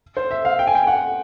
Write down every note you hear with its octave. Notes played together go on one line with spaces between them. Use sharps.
C5
E5
F5
G5
G#5
G5
F#5